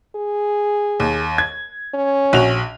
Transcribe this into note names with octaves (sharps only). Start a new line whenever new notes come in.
G#4
D#2
G#6
C#4
A#1 F#4 F7